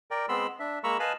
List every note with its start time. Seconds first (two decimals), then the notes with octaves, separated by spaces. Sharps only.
0.11 A#4 D5 G5
0.29 G#3 B3 C4 B5 C6 E6
0.59 D4 E5
0.84 G#3 A#3 A#5 B5 C#6 E6
1.00 B4 D#5 F5 G#5 A5 B5